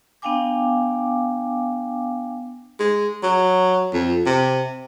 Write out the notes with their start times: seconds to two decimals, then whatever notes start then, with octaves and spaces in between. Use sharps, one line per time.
0.22 B3 D4 F5 G5 G#5 D6
2.80 G#3
3.23 F#3
3.93 F2
4.26 C3